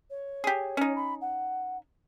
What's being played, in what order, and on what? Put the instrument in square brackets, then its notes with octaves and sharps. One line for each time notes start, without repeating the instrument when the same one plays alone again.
[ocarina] C#5
[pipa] G4 G#4
C#4 D#4
[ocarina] B5
F#5